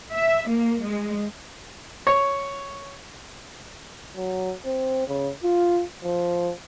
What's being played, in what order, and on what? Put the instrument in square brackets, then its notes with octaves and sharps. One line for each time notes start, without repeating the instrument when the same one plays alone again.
[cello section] E5
A#3
G#3
[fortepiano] C#5
[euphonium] F#3
C4
C#3
F4
F3